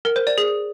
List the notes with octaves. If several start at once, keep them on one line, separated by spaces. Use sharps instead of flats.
A#4
C5
D5
G#4